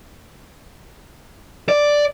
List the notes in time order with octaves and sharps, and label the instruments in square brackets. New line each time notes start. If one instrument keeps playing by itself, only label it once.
[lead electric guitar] D5